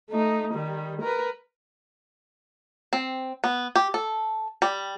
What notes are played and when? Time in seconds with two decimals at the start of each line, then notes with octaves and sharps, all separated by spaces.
0.10 A3 D#4
0.54 D#3 G3
1.02 A#4 B4
2.93 C4
3.44 B3
3.75 G4
3.94 A4
4.62 G3